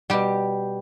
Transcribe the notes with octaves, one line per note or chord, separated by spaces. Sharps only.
B2 G3 G4